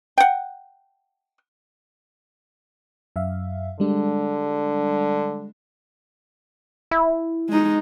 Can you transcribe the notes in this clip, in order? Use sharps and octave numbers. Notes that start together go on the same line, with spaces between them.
F#5 G5
F#2 E5 F5
D3 G3 G#3 D4
E4
G#3 D#4